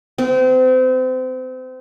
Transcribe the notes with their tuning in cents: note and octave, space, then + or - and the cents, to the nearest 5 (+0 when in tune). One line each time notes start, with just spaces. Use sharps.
C4 -30